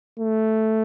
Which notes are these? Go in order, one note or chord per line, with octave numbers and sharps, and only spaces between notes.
A3